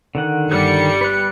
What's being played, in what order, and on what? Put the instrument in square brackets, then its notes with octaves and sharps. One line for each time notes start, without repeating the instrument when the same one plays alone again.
[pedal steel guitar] D3 D#3 F#5
[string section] G1 G3 C#7
[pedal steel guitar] B4 F#6